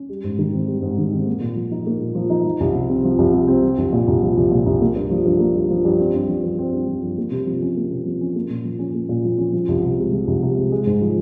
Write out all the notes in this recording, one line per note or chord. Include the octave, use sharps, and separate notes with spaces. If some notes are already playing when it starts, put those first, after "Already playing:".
Already playing: C#4
G3
G#2
D#3
C4
G3
G#2
D#3
C4
A#3
A#2
F3
D#4
A#3
A#2
F3
D#4
F3
C2
C3
C4
F3
C2
C3
C4
F3
C2
A#2
C2
F3
C2
A#2
C2
A#3
G2
F3
G2
A#3
G2
F3
G2
C4
G2
F3
G2
C4
G2
F3
G2
A#3
C3
F3
C#4
A#3
C3
F3
C#4
A#3
A#2
F3
C#4
A#3
A#2
F3
C#4
F3
C2
C3
G#3
F3
C2
C3
G#3
G#3
G#2
F3